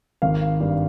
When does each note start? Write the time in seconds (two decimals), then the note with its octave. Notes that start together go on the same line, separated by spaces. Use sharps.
0.22 G#1 F5
0.60 G2